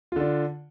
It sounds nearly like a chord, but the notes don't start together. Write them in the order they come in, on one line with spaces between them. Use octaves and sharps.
F4 D3 D4